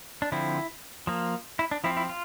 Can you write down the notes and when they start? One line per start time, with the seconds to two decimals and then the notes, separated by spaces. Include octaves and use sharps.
0.22 D4
0.32 D3 F3 C4 E4
1.07 F3 A#3
1.59 E4
1.71 D4
1.84 F3 C4 E4
1.97 E4
2.09 F4